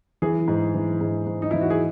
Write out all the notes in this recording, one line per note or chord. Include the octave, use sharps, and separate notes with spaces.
E3 G#4
G#2
E3
G#2
G#2
D#4
E3 E4
F#4
G#4